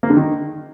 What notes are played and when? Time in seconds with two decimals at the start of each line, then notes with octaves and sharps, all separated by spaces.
0.03 A#3
0.10 D3
0.17 D#3